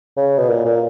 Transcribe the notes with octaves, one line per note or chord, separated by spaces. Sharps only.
C#3
B2
A#2
A#2